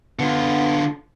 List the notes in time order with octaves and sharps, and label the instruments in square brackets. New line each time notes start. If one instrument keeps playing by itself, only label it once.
[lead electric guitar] D3 F4 [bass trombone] B3